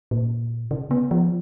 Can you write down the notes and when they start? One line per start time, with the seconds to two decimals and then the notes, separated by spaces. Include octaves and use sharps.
0.11 A#2
0.71 C#3
0.91 B3
1.11 F3